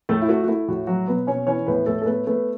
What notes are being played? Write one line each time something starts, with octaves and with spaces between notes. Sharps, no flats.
A2 A3 A4
E4
A3 F#4
F#4
A3 E4
A2 F#4
F#3 F#4
B2 B3 B4
B2 C#4 C#5
E3 C#4 C#5
A2 B3 B4
A2 A3 A4
A4
A3 B3 B4
A3 B3 B4